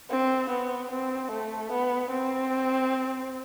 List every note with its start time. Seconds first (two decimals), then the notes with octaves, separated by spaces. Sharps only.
0.10 C4
0.50 B3
0.91 C4
1.31 A3
1.72 B3
2.11 C4